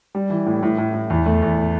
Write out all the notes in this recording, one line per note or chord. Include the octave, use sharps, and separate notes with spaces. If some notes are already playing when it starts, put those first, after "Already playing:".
G3
E3
A2
A2
A2
A2
E2
A3
E2